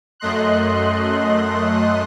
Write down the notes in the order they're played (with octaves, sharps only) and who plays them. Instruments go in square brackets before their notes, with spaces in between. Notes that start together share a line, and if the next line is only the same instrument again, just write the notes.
[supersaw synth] F#2 A3 D#5 C6 F#6